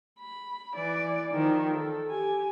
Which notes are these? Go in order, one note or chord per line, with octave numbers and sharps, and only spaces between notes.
B5
E3 D5
D#3 F3
A4
G4 G#5